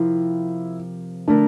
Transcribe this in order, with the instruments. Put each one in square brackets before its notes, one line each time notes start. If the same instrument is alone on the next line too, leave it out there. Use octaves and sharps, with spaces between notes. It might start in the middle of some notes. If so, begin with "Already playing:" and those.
Already playing: [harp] C3 F3 C4 F4 A#4 [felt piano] E4
[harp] D3 A3 E4 A#4 [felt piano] D4